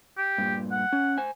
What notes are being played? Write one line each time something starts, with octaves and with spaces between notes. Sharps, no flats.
G4
G2 A#2
F#5
C#4
C5 G#5